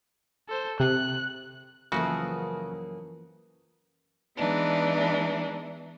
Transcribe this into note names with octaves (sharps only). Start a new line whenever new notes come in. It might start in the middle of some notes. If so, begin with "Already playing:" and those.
A4 C5
C3 F#6
F#2 C#3 E3 F3 A#3 F#4 G#4 A4
E3 G#3 B3 D4 D#4